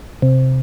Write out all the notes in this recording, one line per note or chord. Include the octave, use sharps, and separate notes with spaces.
C3